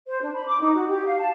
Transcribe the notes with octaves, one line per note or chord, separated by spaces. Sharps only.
C5
D4
B5
D6
D#4
F#4
G4
F5
A5